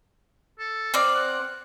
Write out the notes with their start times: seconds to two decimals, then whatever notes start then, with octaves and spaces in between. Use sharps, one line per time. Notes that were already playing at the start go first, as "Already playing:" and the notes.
0.59 A4
0.94 C4 D5 F5
1.14 F#5